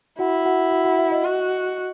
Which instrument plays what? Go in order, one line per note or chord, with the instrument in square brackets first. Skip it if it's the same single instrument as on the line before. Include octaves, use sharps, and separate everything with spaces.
[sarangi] E4 [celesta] F#4 F#5
[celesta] F#4 F#5
F#4 F#5
F#4 F#5
E5
D#5
[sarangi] F#4